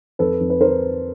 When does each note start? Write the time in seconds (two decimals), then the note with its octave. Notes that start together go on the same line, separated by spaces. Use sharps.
0.19 F2 A4 B4
0.40 F2
0.50 B4
0.61 A#4 C5